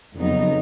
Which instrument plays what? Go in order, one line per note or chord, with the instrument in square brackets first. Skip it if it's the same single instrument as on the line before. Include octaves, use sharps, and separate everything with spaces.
[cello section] F2 C#3 F#3 B3 D#4